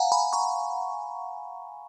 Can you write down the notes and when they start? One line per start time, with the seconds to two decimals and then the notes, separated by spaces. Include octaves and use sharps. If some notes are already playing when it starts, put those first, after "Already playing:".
Already playing: F5 F#5 G#5 A#5
0.12 G#5 B5
0.33 A#5 C#6